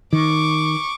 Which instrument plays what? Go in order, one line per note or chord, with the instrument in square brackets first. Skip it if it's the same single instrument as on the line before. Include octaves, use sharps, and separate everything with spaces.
[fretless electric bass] D#3 [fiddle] C#6 D6